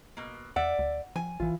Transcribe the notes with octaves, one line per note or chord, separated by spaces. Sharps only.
B2 A#3
E2 D5 E5 F#5
D2
F3 G#5
A#1 E3 F4